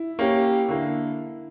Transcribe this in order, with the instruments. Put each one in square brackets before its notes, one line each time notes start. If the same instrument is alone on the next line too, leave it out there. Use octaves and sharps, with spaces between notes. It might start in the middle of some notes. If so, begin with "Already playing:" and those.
Already playing: [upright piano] E4
[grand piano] A#3 C#4 G4
[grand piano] D3 A#3 [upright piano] E4